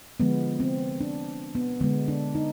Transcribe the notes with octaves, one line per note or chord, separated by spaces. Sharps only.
D3 F3 G#3 B3
C4
D4
B3
D3 G#3 B3
D4
D#4